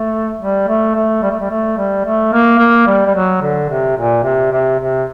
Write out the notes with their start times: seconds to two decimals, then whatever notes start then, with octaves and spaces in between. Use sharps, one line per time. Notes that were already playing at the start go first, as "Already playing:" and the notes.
Already playing: A3
0.39 G3
0.67 A3
0.95 A3
1.23 G3
1.31 A3
1.40 G3
1.50 A3
1.77 G3
2.04 A3
2.32 A#3
2.59 A#3
2.86 G3
3.06 G3
3.14 F#3
3.42 D3
3.69 C3
3.96 A#2
4.24 C3
4.51 C3
4.79 C3